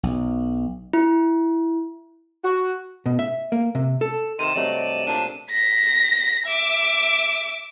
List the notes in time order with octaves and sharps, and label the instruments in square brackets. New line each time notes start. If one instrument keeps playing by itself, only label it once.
[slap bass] B1
[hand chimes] E4
[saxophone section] F#4
[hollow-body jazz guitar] B2
E5
A#3
C3
A4
[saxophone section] C3 D#3 [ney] C6 [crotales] D#7 E7
[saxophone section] G2 D5 [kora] C3 F#3 A3 [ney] D#5
[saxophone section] A#2 G3 D4 [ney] A5 [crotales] D#7
[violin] A#6 B6
E5 D6